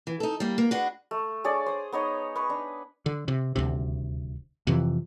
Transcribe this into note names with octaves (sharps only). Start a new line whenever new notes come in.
E3
D#4 A4
G3 A#3
A#3
D4 F#4 G#4 B4
A3
D4 G#4 C#5 D5
C5 D#6
B3 D#4 C#5 D#5
B4 C#6
D4
D3
C3
D#1 G#1 D2 C3
F2 C3 E3